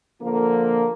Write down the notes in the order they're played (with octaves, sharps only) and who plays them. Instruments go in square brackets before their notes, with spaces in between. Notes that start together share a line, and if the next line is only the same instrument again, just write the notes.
[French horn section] D3 F3 A#3